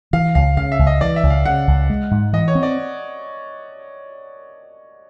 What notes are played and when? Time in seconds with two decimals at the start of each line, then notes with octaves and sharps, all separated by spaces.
0.13 E3 F5
0.35 C#2 F5
0.57 C#3 F5
0.72 E5
0.79 C#2
0.87 D#5
1.01 E3 D5
1.16 E5
1.23 C#2
1.30 F5
1.45 C#3 F#5
1.68 C#2
1.90 G#3
2.11 G#2
2.33 E3 D#5
2.48 C#5
2.55 C4
2.63 D5